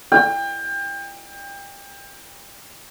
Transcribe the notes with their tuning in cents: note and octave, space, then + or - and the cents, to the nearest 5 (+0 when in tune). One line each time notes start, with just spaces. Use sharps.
G5 +30